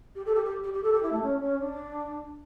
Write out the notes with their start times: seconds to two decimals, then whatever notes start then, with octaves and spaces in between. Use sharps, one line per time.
0.15 G4
0.26 A4
0.35 G4
0.45 G4
0.63 G4
0.73 G4
0.83 A4
0.93 G4
1.03 E4
1.12 A3
1.22 C#4
1.42 C#4
1.60 D4